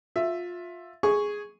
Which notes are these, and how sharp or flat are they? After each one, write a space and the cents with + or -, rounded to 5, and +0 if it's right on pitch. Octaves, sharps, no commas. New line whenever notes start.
F4 +20 E5 +10
G#4 +0 G#5 +0 C#6 +0